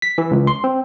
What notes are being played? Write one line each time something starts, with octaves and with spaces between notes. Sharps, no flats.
B6
E3
C#2
C6
C4